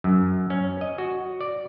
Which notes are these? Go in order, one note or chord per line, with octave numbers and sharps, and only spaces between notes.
F#2
C#4
D#5
F#4
D5